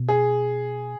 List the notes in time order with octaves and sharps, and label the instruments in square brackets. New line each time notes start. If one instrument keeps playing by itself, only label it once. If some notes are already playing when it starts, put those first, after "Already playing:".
Already playing: [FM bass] B2
[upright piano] G#4